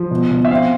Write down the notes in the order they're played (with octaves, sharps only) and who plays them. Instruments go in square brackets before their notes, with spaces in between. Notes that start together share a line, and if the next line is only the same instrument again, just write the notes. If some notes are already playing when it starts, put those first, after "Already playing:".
Already playing: [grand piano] F3
B2
B2
E5
C4 F5